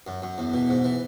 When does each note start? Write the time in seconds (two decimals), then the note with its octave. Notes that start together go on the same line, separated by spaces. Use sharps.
0.07 F#2
0.22 F#2
0.38 E2
0.54 B2
0.69 G#2
0.84 E3